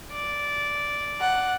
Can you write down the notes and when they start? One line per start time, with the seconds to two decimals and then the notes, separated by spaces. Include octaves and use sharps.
0.12 D5
1.21 F#5